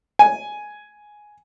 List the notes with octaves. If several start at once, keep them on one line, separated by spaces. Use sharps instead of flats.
G#5